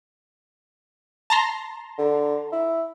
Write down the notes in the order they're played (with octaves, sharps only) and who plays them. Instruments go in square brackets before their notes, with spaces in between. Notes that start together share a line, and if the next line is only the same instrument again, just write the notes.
[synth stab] A5 A#5 C6
[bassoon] D3
E4